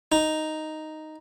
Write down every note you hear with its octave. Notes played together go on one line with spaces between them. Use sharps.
D#4